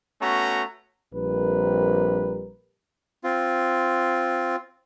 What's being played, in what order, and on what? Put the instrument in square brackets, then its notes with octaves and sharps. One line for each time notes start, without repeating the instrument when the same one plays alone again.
[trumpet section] A3 B3 C#4 F#4 A#5
[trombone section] A#1 G3 C4 A#4 B4
[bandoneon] C4 F4